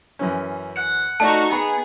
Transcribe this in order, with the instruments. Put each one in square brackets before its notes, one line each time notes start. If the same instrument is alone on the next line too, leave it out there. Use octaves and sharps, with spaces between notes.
[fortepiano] F#2 E3 C#4
[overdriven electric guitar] F#5
[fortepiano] A3 D5 [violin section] D#4 F#4 C#6 [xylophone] A5
[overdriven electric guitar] B3 [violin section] G#4 [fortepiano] A#5